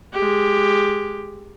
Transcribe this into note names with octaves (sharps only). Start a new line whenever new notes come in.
G#3 G4